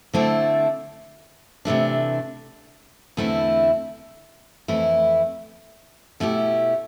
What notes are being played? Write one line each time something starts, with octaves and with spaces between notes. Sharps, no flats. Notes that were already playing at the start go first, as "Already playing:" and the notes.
D3 A3 C4 E4 A4
C3 E3 A3 D4
E2 D3 A3 C4 E4
F2 E3 A3 E4
B2 A3 E4 G4